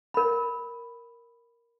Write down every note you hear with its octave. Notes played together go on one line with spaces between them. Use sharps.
A#4 B5